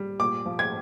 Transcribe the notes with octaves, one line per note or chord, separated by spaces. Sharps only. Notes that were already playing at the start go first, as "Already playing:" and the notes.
Already playing: G3
A#2 D6
F3
G#6